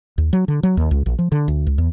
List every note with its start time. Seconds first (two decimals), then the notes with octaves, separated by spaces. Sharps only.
0.18 D#2
0.33 F#3
0.48 D3
0.63 F#3
0.77 D#2
0.91 C#2
1.06 A#1
1.19 F3
1.32 D3
1.48 D2
1.67 C#2
1.78 E2